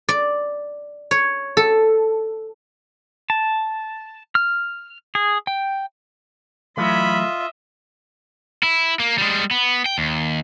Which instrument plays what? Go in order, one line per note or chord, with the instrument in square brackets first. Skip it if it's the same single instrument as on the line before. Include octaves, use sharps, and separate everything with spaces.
[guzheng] D5
C#5
A4
[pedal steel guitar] A5
F6
G#4
G5
[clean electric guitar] E3 F#3 A3 [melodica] F4 [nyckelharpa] D#5 E5 [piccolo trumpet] B5
[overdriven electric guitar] E4
A#3
G3 G#3
B3
G5
D#2